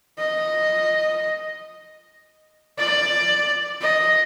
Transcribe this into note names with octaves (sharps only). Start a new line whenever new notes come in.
D#5
D5
D#5